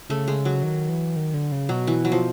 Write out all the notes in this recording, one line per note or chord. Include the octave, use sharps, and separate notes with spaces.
C#3 A3
G#3
F#3
D#3
E3
D#3
D3
C#3
B2 F#3
E3
F#3
F3